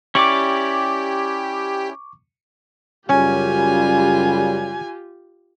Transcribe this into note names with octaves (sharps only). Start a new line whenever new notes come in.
C#4 E4 G4 D5 C#6 D6
F#2 C#3 G3 C#4 F4 G4 G#5